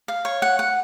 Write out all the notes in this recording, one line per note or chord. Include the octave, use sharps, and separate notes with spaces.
F5
C#5
F#5
F#5